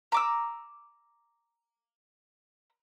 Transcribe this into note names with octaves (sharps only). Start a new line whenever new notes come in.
A#5 D6 E6